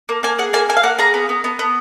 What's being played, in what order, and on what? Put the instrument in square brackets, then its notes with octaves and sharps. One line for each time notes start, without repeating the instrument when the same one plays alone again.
[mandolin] A#3
A#3 G#5
G#4 F#5
A#3 G#5
A#3 G#5
F5
A#3 F#5
G#4 A#5
B3
B3
B3
B3